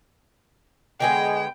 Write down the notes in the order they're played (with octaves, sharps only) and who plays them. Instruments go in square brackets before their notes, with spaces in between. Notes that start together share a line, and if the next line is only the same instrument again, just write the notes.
[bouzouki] D3 G#3 B3 [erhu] G5